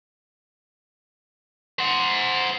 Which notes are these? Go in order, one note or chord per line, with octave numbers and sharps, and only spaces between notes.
C5 F#5